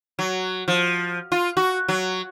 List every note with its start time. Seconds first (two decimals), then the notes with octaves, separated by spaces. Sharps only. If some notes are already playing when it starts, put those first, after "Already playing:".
0.19 F#3
0.68 F3
1.32 F4
1.57 F#4
1.88 F#3